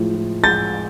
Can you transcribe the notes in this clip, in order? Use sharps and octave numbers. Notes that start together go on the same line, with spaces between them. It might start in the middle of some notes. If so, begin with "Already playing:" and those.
Already playing: A2 F3 G#3
A2
G#3 G6 A6